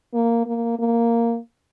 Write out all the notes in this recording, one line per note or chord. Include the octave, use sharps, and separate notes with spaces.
A#3
A#3
A#3